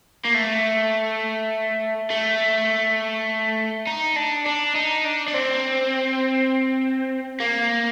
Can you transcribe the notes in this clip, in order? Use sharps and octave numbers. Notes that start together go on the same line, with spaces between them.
A#3
A3
A3
D#4
D4
D4
D#4
D4
D4
C4
A#3